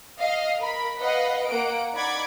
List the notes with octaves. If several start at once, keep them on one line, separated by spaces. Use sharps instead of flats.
D#5 F5
A#4 B5
B4 D#5 F5 F#5
A#3 F#5 D7
D#4 D5 F#5 B5 D6 G#6